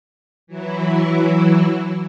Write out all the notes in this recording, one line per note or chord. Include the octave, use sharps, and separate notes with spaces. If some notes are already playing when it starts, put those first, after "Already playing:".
E3 F#3 E4